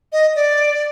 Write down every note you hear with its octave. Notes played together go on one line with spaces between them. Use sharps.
D#5
D5